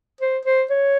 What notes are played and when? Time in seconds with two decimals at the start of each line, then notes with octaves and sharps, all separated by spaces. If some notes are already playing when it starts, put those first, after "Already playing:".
0.21 C5
0.45 C5
0.70 C#5